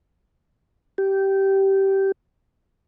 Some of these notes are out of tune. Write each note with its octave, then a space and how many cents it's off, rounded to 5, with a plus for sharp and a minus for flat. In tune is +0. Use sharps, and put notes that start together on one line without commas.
G4 -15